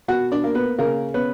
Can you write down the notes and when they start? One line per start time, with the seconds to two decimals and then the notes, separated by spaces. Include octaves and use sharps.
0.08 B2 F#4 F#5
0.32 D4 D5
0.44 A#3
0.55 B3 B4
0.79 C#3 A#3 A#4
1.14 B3 C#4 B4